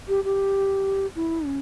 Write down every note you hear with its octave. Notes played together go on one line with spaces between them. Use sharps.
G4
G4
E4
C#4